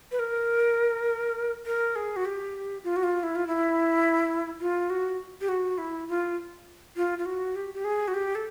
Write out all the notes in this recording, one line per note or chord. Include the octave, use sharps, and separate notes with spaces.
B4
A#4
A#4
G#4
F#4
G4
F4
F#4
F4
E4
F4
E4
F4
F#4
G4
F#4
E4
F4
F4
F4
F#4
G4
G4
G#4
F#4
G4
A4